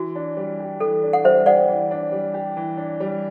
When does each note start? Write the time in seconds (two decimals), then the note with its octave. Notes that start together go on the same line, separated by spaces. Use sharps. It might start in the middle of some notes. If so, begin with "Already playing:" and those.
Already playing: E3 F#4
0.16 D4
0.37 G3
0.60 G4
0.80 E3 A4
1.04 D4
1.13 F#5
1.24 G3 C5 E5
1.46 G4 D5 F#5
1.68 E3
1.91 D4
2.12 G3
2.34 G4
2.57 E3
2.77 D4
3.00 G3